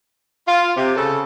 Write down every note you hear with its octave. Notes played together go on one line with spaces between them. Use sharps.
F4
C3
C#3 A4